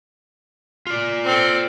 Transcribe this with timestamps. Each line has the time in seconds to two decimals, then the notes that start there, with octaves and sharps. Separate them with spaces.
0.87 F4 D5
1.25 C4 A4